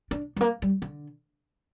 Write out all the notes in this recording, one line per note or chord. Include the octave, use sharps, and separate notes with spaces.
D4
G3
A#3
G3
D3